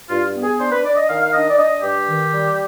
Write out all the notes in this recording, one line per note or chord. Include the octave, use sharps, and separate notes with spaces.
G2 F4
B3
G#4
D4 C5
B4
D4 D5
D#5
D#3 F5
F5
D4 D#5
D5
D4 D#5
G2 G4
D#3
G3